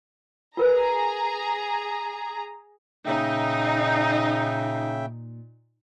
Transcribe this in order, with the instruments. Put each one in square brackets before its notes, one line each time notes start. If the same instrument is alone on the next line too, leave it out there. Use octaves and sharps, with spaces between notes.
[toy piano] F4 A#4 B4 [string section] G#4 A#5
[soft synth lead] A#2 [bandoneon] C#3 E5 G5 [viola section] D#4